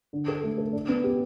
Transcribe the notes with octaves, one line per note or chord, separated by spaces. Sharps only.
D3
A4
A3
A4
D4
B3
G4